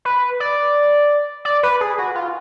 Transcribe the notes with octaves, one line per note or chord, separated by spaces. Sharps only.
B4
D5
D5
B4
G#4
F#4
F4